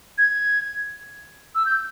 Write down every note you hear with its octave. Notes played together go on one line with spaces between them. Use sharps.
G#6
E6
G6